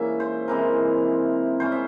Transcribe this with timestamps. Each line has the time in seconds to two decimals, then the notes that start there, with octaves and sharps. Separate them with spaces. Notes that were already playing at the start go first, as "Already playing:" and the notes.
Already playing: G#2 E3 A#3 C#4 E5
0.20 C5
0.48 C3 E3 G#3 A#4
1.60 G#2 G3 C#4 C5
1.72 E5